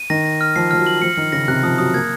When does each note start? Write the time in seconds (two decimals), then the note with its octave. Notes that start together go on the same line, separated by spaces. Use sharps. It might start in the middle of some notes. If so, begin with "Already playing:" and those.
Already playing: D#7
0.10 D#3 A#6
0.25 A#6
0.41 F6
0.56 F3 C7
0.71 F3 F6
0.79 F#3
0.86 F#7
1.02 F3 C#7
1.17 D#3 F6
1.32 C#3 A#6
1.48 C3 F#6
1.63 F3 D#6
1.78 F#3 D#6
1.94 A#3 G#6